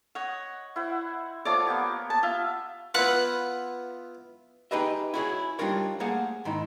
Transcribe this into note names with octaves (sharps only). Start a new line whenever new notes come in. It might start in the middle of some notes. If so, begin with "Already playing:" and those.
C#5 D#5 F#5
E4 C5 F#5
F3 A3 C#5 D5 D6
A#3 B3 G4
A5
F4 E5
B3 E4 F4 B4 F#5 F#6
D#4 G4 G#4 B4 D#5 E5
E4 F#4 G#4 C#5
G3 D4 D#4 F4 A#4 C#5
A3 A#3 G#4 C5 F5 F#5
G#2 D#3 D#4 E4